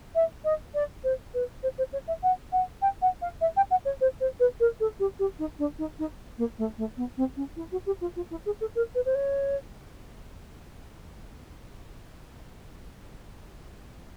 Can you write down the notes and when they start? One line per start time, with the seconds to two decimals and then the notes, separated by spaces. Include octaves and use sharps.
0.15 E5
0.44 D#5
0.74 D5
1.04 C5
1.34 B4
1.63 C5
1.78 C5
1.93 C#5
2.07 E5
2.23 F#5
2.52 F#5
2.82 G5
3.02 F#5
3.22 F5
3.41 E5
3.56 G5
3.71 F#5
3.85 C#5
4.01 C5
4.20 C5
4.40 B4
4.60 A#4
4.80 A4
5.00 G4
5.19 G4
5.39 D#4
5.59 D4
5.79 D#4
5.99 D#4
6.38 A#3
6.58 A3
6.78 A3
6.97 B3
7.17 C4
7.36 C#4
7.56 E4
7.72 F#4
7.86 G4
8.01 F4
8.16 F4
8.31 E4
8.46 G#4
8.61 A4
8.75 A#4
8.95 B4
9.05 C5
9.15 C#5